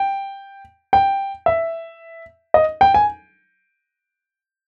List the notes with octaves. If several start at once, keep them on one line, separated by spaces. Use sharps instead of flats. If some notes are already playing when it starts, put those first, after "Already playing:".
Already playing: G5
G5
E5
D#5
G5
G#5